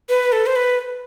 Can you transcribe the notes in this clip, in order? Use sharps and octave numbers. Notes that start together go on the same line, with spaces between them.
B4
A4
C5
B4